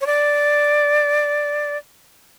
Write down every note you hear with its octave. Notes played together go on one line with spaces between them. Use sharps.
C#5
D5